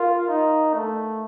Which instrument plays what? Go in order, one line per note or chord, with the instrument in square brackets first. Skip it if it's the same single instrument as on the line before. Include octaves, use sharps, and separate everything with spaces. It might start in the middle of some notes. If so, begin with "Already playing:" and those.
Already playing: [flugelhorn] F4 [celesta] A#4 F5 C6
[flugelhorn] D#4
A3